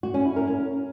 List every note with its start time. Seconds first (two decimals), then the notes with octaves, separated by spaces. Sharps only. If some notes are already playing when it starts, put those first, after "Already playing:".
0.03 F#4
0.14 C#4
0.25 E4
0.36 A#4
0.47 C#4